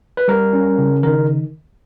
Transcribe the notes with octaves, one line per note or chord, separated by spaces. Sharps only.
B4
G3 A#4
C#4
C#3
D#3 A#4